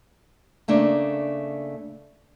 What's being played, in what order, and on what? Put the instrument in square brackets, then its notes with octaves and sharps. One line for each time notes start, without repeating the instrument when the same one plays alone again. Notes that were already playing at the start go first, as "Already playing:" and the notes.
[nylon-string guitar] C#3 A3 A#3 D4